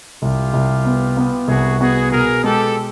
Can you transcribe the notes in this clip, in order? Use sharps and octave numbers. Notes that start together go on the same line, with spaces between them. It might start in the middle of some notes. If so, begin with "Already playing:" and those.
C2 F4 G4
C2
B3
B3
C2 F#4 G#4
B3 F#4 G#4
B2 G#4 A#4
G#3 G4 A4